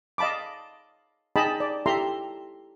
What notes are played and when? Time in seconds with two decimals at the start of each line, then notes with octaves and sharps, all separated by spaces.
0.18 D#5 F5 A5 B5 D6
1.36 D#4 G#4 D#5 G5 A5 B5
1.60 D5
1.86 E4 G4 A4 E5 A#5 C6